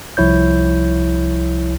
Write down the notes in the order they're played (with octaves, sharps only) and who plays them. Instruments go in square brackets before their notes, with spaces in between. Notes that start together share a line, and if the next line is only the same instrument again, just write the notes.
[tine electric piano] C2 F3 E4 C#5 G6